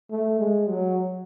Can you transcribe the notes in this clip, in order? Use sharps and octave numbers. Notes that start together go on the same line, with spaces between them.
A3
G#3
F#3